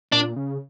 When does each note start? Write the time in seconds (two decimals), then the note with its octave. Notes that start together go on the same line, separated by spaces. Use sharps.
0.12 A#2 D4
0.36 C#3